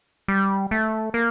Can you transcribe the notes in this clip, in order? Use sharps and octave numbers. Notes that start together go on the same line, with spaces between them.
G3
A3
A#3